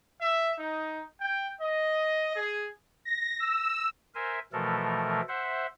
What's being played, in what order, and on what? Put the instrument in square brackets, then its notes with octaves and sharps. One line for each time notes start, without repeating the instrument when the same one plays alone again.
[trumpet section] E5
D#4
G5
D#5
G#4
[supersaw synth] A#6
E6
[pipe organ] A#4 C5 E5 G#5
B2 E3 F3 A3 A4 A#4
C5 E5 F#5